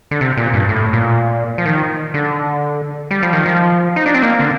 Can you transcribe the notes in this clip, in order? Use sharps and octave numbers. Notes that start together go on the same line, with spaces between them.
D3
C3
A#2
G2
A2
A#2
F3
D#3
D3
G3
F3
D#3
F3
D#4
D4
C4
A#3
D3